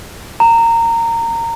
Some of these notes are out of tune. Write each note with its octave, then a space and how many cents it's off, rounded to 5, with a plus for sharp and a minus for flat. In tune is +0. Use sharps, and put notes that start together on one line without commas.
A#5 -20